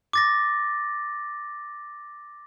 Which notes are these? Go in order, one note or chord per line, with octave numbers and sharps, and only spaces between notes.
D6 A6 A#6